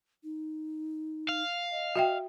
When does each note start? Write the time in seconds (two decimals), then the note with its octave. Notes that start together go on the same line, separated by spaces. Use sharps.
0.24 D#4
1.29 F5
1.72 D#5
1.96 F#4 E5 G5